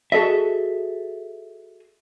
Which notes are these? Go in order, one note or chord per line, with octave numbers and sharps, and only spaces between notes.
F#4 G#4 A4 D#5 E5